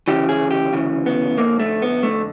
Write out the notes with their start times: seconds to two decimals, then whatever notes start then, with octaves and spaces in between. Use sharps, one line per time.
0.08 D2 C#3 E3 G4
0.29 G#4
0.51 G4
0.73 D2 C#3 E3
1.06 B3
1.38 F2 D3 A#3
1.59 A3
1.82 B3
2.03 F2 D3 A3